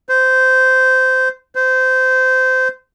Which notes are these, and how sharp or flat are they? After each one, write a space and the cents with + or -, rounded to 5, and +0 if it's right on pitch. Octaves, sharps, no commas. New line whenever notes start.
C5 -15
C5 -20